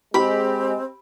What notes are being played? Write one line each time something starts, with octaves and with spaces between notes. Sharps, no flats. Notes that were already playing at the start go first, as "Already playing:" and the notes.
G#3 C4 G4 B5